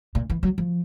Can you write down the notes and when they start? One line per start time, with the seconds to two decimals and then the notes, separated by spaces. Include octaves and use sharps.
0.15 A#2
0.30 E3
0.43 F#3
0.58 F3